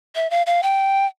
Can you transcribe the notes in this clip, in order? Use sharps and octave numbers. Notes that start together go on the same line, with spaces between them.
E5
F5
F5
G5